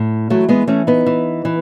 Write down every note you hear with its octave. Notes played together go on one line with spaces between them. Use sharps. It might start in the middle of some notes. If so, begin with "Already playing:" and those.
Already playing: A2
E3 F#3 A3
G#3 B3
E3 A3 C#4
B3 D#4
E3
E3